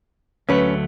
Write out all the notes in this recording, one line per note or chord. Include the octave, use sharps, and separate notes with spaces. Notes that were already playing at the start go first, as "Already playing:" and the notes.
D2 F#3 A3 C#4 B4